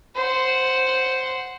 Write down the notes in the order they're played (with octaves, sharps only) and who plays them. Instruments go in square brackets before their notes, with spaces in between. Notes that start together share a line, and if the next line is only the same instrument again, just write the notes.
[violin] C5 F#5